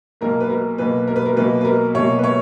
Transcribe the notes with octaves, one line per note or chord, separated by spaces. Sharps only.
B1 B2 A#3 A#4
B4
A#4
B1 B2 A#3 B4
A#4
B4
A#4
B1 B2 A#3 B4
B4
A#4
B1 B2 A#3 C#5
B4
C#5